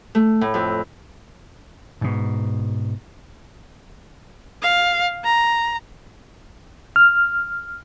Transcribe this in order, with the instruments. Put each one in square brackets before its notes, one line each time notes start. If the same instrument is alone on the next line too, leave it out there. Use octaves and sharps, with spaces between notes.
[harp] A3
A2
F2
[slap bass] G#2 B2
[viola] F5
A#5
[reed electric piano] F6